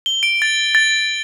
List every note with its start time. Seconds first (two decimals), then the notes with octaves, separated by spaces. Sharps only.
0.06 G7
0.23 D7
0.42 A6
0.75 A6